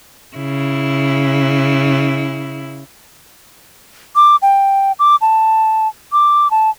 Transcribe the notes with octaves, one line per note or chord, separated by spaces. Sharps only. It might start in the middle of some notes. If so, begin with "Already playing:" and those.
C#3 E4
D6
G5
D6
A5
D6
A5